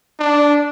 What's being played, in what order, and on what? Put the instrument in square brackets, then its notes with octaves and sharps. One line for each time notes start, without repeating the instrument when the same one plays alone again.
[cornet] D4